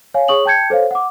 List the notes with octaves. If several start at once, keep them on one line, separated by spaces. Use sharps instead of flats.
C#5 F5 G#5
G#4 C#5 C#6 D#6 F#7
G5 A5 G6 G#6 C#7
A4 C5 C#5 F5
F#5 D6